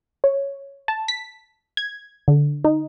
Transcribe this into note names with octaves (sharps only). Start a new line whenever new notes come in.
C#5
A5
B6
G#6
D3
D#4